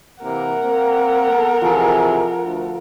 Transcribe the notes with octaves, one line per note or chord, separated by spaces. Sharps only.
C3 E3 A#3 A#4 F#5
A#3 C4
B3 A4
C3 E3 F3 G#4 A4
D2